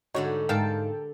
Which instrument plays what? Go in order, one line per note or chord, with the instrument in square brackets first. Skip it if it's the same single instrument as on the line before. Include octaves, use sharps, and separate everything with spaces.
[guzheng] G#2 D3 G3 [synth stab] D#4 F#4 C#5
[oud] G#2 F5 [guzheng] A4 [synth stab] A#4 G5 A5